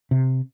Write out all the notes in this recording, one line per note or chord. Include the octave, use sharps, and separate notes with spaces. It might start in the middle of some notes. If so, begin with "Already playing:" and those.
C3